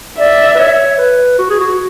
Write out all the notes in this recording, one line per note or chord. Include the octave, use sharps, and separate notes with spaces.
D5 E5
B4
C#5
B4
F#4
G#4
F#4